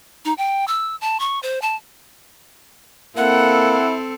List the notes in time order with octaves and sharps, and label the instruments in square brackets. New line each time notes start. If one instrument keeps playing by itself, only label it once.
[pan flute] D#4
G5
E6
A5
C#6
C5
A5
[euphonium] A#3 [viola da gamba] C4 A4 [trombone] E4 [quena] F#5